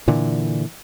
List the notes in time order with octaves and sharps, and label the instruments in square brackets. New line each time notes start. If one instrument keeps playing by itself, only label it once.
[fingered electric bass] A#2 D3 E3